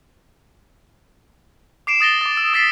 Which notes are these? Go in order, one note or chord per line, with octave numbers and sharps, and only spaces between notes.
D6 C7 D7 E7
D#6 A6 A#6 G7
D6 D#6
E6
D#6 A6 B6 C7 D7